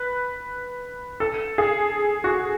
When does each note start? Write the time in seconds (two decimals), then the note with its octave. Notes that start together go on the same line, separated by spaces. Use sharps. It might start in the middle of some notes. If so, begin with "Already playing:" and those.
Already playing: B4
1.20 A4
1.58 G#4
2.24 F#4